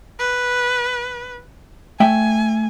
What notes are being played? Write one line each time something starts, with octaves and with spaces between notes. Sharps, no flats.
B4
A3 E5 G5 G#5